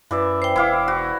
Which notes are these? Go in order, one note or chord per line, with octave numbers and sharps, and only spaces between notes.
F#2 E3 D5 E5
C5 G5
E1 E4 F5 D6
F#4